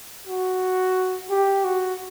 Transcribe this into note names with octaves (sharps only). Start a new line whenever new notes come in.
F#4
G4
F#4